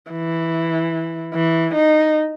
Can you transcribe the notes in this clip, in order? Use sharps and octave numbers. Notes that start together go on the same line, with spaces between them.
E3
E3
D#4